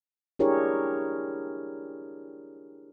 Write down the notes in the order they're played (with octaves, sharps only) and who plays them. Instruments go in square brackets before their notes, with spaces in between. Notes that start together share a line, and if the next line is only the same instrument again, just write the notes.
[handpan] D4 E4 G4 G#4 A#4 C#5